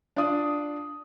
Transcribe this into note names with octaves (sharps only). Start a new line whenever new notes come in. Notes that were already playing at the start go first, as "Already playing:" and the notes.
D4 F4 D5 D#6